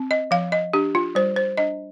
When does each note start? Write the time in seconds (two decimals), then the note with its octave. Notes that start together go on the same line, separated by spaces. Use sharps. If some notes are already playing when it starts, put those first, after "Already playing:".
Already playing: C4
0.11 D#5
0.31 F3 F5
0.52 D#5
0.73 D4 G4
0.95 F4
1.15 G3 C5
1.36 C5
1.57 D4 D#5